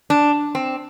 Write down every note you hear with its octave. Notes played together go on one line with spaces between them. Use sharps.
D4
C4